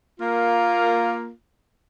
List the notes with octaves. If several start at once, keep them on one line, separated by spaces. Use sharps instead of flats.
A#3 F4